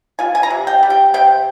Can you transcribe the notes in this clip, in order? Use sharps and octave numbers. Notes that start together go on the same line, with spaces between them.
F4 G#5
G#5
A#5
C3
G5
G3
G5
C3 G5